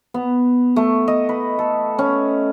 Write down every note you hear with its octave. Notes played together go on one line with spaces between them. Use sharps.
B3
A3
D#5
B4
A4
C#4